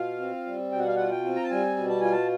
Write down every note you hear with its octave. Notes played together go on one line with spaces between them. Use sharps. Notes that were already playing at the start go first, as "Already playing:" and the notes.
Already playing: B2 F4 F5
C4
G3
B2 G5
F#5
F5
F4 F#5
G5
C4
A#5
A5
G3 G#5
B2
A5
F4 G#5
A5